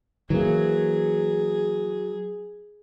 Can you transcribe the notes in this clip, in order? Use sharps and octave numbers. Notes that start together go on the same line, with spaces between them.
E3 F#3 A#3 G#4